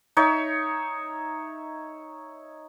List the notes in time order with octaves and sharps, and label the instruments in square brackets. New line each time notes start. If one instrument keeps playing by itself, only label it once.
[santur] D#4 C#5 E5